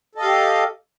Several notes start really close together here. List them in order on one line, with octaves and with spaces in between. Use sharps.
A4 D#5 F5 G4